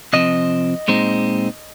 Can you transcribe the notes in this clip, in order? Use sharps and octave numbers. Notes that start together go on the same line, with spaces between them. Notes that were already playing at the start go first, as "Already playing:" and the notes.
C3 F3 C4 D#5
A#2 G#3 C4 D#4